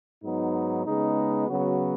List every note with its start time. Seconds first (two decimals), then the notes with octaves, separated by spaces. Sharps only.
0.22 G#2 F#3 B3 D#4
0.85 C#3 G#3 B3 D#4
1.47 C#3 F#3 B3 F#4